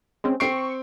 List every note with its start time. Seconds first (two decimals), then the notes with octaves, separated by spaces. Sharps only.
0.24 G#3 C4 C#4
0.40 C4 C#6 C7 D7